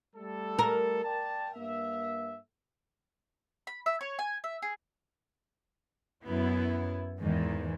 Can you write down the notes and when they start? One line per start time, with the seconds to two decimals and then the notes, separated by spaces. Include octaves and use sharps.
0.16 G3 A3 A4
0.59 A#4
1.03 D5 G5 A5
1.55 G2 A#3 E5
3.67 B5
3.86 E5
4.01 C#5
4.19 G#5
4.44 E5
4.62 G#4
6.25 F#2 B3 E4
7.20 E2 G#2 D#3 E3